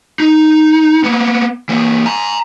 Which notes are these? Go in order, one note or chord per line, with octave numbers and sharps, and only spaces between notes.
D#4
A#3 B3
E3 A#3
G#5 A#5